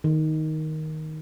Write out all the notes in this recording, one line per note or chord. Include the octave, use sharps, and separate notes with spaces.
D#3